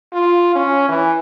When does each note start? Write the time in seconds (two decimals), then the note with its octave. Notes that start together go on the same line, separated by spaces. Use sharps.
0.13 F4
0.55 C#4
0.89 E3